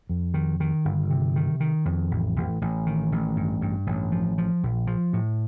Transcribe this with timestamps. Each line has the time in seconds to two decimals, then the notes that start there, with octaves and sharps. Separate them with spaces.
0.09 F2
0.34 D#3
0.60 D#3
0.85 G1
1.11 C3
1.36 D#3
1.60 D#3
1.85 F2
2.11 A1
2.36 A1
2.61 A1
2.86 D#3
3.12 A1
3.36 G2
3.62 G2
3.87 A1
4.12 F3
4.38 F3
4.63 A#1
4.87 F3
5.13 A2